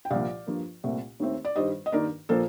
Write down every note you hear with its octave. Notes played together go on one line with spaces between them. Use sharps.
G5
C2 A#2 F3 D5 F5
G2 F3 A#3
C2 A#2 A3 C4
D#2 D#3 A3 C4
D5
G2 D#3 G3 C5 D#5
D#5
G2 D#3 A#3 A#4 D5
A#2 F3 A#3 A4 C5